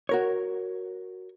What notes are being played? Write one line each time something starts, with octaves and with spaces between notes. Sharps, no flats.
F#4 A#4 C#5